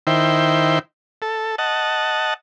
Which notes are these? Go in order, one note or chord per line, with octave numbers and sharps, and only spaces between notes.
D#3 E4 C5 G5
A4
D#5 F#5 A5